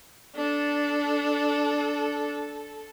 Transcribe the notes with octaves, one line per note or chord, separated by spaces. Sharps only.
D4 A4